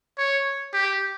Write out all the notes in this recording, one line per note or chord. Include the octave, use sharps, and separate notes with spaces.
C#5
G4